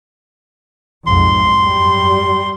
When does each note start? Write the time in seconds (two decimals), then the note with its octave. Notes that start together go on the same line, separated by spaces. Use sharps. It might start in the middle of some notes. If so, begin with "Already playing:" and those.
1.07 B1 F2 G#2 C6
1.61 F#2 G3